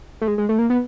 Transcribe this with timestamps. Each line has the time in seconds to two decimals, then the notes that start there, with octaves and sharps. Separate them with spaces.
0.21 A3
0.28 G#3
0.38 G#3
0.49 A3
0.59 A#3
0.70 B3